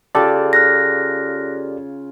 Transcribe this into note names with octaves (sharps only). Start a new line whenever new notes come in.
C#3 F4 G4 A4 D5
F6 F#6 A#6